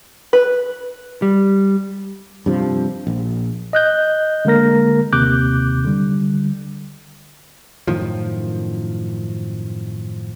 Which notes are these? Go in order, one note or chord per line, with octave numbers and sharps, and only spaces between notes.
B4
G3
G2 C3 F3
A#1
D#5 F#6 G6
D3 G#3 A#3 A#4 A#6
D#2 C3 D6 F#6 G6
D3 G3
F#2 A2 D#3 F3